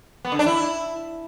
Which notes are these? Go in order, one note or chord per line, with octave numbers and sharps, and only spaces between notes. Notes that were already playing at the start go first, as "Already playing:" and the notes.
B3
D3
D4
E4